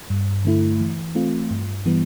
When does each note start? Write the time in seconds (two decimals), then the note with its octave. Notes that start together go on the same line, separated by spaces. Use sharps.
0.10 G2
0.45 D3 A3 E4
0.80 E3
1.15 A3 C4 F4
1.51 G2
1.86 E3 G3 B3